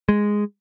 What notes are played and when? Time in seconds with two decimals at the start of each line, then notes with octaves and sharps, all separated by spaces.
0.09 G#3